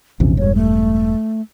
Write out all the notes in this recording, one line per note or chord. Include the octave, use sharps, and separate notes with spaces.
A#1 E2 C3 C#4
E1 G2 C#5
A3